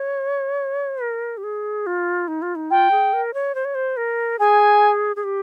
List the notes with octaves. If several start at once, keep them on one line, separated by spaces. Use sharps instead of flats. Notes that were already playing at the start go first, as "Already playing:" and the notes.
Already playing: C#5
A#4
G4
G#4
F4
D#4
F4
D#4
F4 G5
G#4
A#4
C#5
C5
C#5
C5
A#4
G#4 G#5
G#4
G4